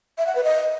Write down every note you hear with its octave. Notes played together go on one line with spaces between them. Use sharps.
E5
F#5
B4
D#5